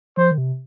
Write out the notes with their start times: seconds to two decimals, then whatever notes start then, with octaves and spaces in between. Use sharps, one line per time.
0.17 F3 C5
0.31 D#3
0.38 C3